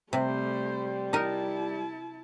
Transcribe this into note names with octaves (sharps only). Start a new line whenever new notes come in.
C3 G3 A3 C5
D#4 E4 A#4 A5